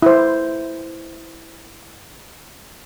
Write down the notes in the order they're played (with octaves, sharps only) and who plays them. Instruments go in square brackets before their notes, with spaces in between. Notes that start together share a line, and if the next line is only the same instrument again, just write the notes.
[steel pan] E4 C5